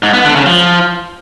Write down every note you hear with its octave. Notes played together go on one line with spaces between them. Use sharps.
G#2
B3
D3
C#3
F3